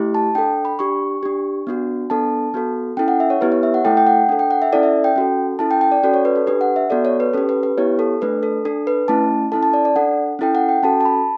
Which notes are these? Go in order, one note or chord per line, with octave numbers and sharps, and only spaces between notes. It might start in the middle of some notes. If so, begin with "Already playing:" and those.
Already playing: A3 E4 G4
A5
D4 A4 G5
B5
D4 G4 C#6
D4 G4
B3 D4 F#4
B3 D4 A4 A5
B3 F#4 A4
C#4 E4 A4 G5
F#5
E5
C#5
B3 E4 G4 B4
C#5
E5
F#5
A3 E4 A4 G5
G5
F#5
D4 A4
G5
F#5
E5
C#4 E4 A4 D5
E5
G5
C#4 F#4 A4
C#4 E4 A4 A5
G5
G5
D5
C#4 F#4 A4 D5
C#5
B4
A4
D4 G4 B4
F#5
E5
B3 F#4 A4 D5
C#5
B4
C#4 G4 A4
B4
B4
B3 E4 G4 C#5
A4
A3 D4 A4 B4
A4
D4 A4
B4
A3 C#4 E4 A5
C#4 E4 A4 A5
A5
D5
D5
D4 A4 F#5
C#4 E4 A4 G5
F#5
G5
C#4 F#4 A4 A5
A5
B5